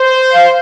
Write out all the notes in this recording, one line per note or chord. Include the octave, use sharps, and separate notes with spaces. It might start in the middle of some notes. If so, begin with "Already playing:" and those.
Already playing: C5
F5